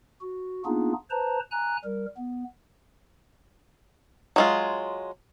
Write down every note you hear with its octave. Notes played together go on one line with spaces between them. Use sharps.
F#4
A#3 B3 D4 D#4 F4 G#4
B4 C5 A5 A#5
G#5 A#5 F#6
G3 A#4
B3
F#3 G#3 F4